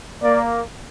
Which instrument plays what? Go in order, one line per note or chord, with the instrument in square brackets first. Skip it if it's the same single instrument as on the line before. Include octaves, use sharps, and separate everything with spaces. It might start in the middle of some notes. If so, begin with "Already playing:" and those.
[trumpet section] A#3 [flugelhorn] D5